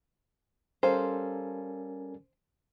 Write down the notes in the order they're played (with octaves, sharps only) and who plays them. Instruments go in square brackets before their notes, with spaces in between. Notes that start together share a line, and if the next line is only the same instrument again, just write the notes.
[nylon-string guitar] G3 A4 F5 [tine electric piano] C#4 A#4 G#5 [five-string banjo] C5